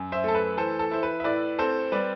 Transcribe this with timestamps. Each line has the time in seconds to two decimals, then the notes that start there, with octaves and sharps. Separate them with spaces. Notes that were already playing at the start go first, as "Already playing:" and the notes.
Already playing: F#2
0.12 C5 E5
0.24 A3 A4
0.35 B4
0.57 E3 A4 C5
0.79 A4
0.91 E4 C5
1.03 B4
1.20 E5
1.24 A2 B4 D5
1.59 C4 A4 C5
1.92 G3 B4 D5